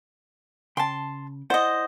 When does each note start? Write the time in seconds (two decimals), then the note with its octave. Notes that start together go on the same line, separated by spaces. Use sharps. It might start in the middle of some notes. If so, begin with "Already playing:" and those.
0.77 C#3 G5 A5 C6
1.50 E4 C5 D5 D#5 F#5